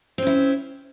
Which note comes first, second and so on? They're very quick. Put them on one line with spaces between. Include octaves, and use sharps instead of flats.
C4 C#4 E4